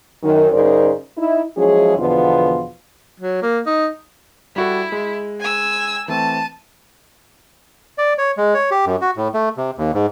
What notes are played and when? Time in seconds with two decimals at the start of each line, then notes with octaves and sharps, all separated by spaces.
0.23 F#2 D#3
0.52 F#2 C#3 D#4 A#4 C5 D5
1.18 D#4 E4
1.57 F3 F#3 G#3 C#4 E4 G#4
1.98 E2 B2 D3 F3 B3 F4
3.20 F#3
3.43 A#3
3.66 D#4
4.56 G3 E4 F#4 A4
4.92 G#3
5.41 G#5 E6
6.08 E3 A3 C4 A5 D#7
7.98 D5
8.18 C#5
8.37 G#3
8.54 C#5
8.71 G4
8.86 F#2
9.01 F#4
9.17 A2
9.34 A3
9.57 C3
9.78 D#2
9.94 G#2